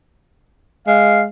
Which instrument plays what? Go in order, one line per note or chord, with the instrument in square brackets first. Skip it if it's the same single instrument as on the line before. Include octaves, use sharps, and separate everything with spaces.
[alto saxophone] G#3 [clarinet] F5